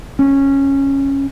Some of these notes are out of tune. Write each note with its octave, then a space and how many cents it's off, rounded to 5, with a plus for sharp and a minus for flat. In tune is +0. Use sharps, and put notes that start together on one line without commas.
C#4 -10